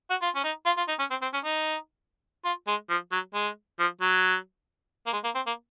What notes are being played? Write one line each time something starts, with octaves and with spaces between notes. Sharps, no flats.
F#4
F4
C#4
D#4
F4
F4
D#4
C#4
C4
C4
C#4
D#4
F4
G#3
F3
F#3
G#3
F3
F#3
A#3
G#3
A#3
C4
A#3